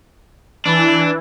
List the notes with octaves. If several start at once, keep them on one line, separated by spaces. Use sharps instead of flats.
E3 D4